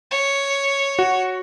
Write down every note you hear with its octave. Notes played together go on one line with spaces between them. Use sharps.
C#5
F#4